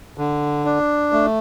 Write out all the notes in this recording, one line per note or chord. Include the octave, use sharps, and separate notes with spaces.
D3
D4
A3